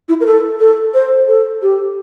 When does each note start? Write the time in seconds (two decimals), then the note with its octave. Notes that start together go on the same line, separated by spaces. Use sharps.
0.09 E4
0.20 A#4
0.26 A4
0.60 A4
0.94 C5
1.28 A4
1.62 G4